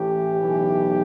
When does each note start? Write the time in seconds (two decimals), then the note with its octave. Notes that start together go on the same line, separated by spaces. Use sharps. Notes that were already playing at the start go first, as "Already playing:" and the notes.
Already playing: A1 A2 E3 G4
0.39 B1 A2 E3